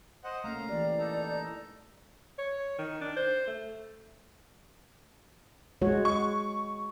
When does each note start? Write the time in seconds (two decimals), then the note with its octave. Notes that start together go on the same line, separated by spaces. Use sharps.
0.24 C5 D#5 F#5
0.44 A3 A#3 C#4 F5 A#5
0.69 E3 G4 D5
0.99 D#4 A4 A#5
2.38 C#5
2.78 D#3
3.01 D4
3.16 C5
3.47 A3
5.82 G#3 F#4 C#5
6.05 C#6